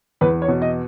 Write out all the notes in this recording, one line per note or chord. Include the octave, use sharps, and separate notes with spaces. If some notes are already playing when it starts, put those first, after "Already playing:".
E2 B4
C#5
B2
D#5